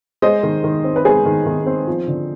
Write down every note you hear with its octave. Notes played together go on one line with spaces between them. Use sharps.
G#3 C5 D#5
D#3
D#3
C4
B4
G#3 G#4 C5
D#3
D#3
C4
F3
D3